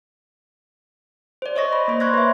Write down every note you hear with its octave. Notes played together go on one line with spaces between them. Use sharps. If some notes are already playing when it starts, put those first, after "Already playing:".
C5 D5
C5 C#5 D#5 C#6 A#6
B5
A#3 C5
C6 C#6 F#6 G#6 A#6
B4 E5